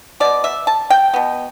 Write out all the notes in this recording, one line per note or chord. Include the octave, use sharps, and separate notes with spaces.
B2 B3 D5
E5
A5
G5
B2 B3